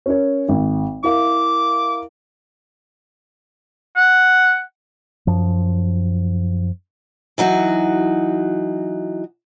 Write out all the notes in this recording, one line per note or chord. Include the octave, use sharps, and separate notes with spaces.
C#4 A#4 C#5
G#1
E4 A#4 F5 D6
F#5
F#2 F3
E3 F#3 D#4 F#4